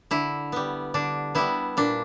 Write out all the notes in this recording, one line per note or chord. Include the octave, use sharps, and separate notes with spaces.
D3 E4
G3 B3
D3 D4
G3 B3 E4
A#2 D4